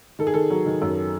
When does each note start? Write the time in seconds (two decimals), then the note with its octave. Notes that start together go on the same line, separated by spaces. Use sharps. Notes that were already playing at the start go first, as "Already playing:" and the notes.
0.19 D#3 A4
0.27 G#4
0.34 D#3 A4
0.50 F#3
0.66 D#3
0.82 F#2